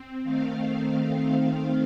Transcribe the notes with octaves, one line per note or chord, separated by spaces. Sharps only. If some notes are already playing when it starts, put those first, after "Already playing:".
Already playing: C4
D#3 A3 C4 F5